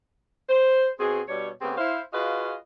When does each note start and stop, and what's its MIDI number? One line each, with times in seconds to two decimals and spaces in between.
0.49 0.88 72
0.99 1.20 47
0.99 1.20 60
0.99 1.20 66
0.99 1.20 68
1.28 1.48 47
1.28 1.48 55
1.28 1.48 62
1.28 1.48 73
1.61 1.76 49
1.61 1.76 57
1.61 1.76 59
1.61 1.76 60
1.61 1.76 67
1.61 1.76 68
1.77 2.01 64
1.77 2.01 72
1.77 2.01 77
2.13 2.54 65
2.13 2.54 66
2.13 2.54 68
2.13 2.54 71
2.13 2.54 75
2.13 2.54 77